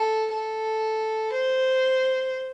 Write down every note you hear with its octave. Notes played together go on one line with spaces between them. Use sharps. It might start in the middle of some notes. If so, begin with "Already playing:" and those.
Already playing: A4
A4
C5